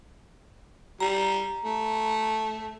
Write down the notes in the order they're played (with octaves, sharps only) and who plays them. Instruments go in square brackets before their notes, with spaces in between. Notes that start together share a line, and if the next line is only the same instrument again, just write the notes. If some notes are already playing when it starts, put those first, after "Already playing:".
[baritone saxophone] G3 [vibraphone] A#5
[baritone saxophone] A3